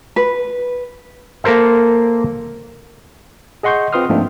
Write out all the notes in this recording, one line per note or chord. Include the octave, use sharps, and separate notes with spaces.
B4
A#3 A4 A#4 C5 E5
G#4 D#5 F#5 C6 C#6 G6
C4 F4 B4 C6 D#6 F6
G#2 F3 A3 A#3 C4 D4